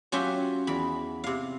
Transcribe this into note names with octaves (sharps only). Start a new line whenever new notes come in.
F#3 C#4 F4 G4 E5
E2 B5
C3 F5